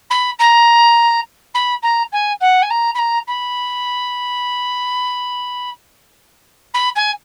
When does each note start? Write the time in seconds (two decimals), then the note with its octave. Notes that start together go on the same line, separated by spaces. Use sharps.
0.10 B5
0.39 A#5
1.54 B5
1.82 A#5
2.12 G#5
2.41 F#5
2.62 G#5
2.70 A#5
2.94 B5
2.98 A#5
3.27 B5
6.74 B5
6.96 G#5